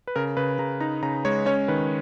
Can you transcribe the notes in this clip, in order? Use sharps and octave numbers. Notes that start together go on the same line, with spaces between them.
B4
C#3 A#4
C#3 B4
C#3 A#5
D#4 A#5
C#3 A#5
G#3 C#5
C#4 C#5
D#3 B4